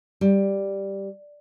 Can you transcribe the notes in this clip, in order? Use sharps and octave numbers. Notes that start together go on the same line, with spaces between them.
G3